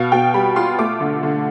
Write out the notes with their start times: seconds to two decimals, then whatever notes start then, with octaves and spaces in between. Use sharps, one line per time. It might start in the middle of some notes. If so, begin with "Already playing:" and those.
Already playing: B2 F5
0.12 B2 G5
0.34 G3 B5
0.56 F4 C6
0.78 A3 D6
1.00 D3
1.23 D3